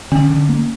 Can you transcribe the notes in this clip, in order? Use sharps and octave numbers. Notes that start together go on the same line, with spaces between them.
D3 C#4
D3
A#3